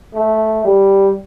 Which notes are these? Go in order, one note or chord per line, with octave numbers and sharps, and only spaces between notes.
A3
G3